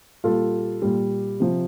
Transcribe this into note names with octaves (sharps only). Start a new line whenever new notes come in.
A#2 G3 F4 A4
A#2 G3
C3 F3